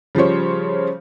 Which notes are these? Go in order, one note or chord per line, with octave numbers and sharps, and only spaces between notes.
C#3 F3 G3 C5 C#5